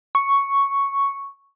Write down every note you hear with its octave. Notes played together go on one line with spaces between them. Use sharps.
C#6